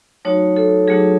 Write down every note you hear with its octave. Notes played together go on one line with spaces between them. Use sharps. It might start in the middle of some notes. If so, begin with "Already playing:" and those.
F#3 A3 D#4 F#4 C#5
A4
F#3 A3 D#4 F#4 G#4